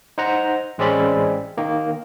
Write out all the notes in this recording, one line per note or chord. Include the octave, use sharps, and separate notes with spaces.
D#4 C5 F#5 A#5
A1 G#3 C4 C#4 D5 B5
D#3 A#3